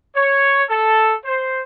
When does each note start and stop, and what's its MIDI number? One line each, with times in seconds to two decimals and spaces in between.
0.14 0.62 73
0.68 1.13 69
1.24 1.60 72